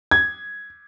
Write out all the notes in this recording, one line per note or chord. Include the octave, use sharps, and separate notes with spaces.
G#6